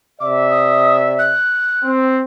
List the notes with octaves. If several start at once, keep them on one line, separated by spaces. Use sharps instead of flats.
C3 D5 E5 D6
D#6
F#6
C4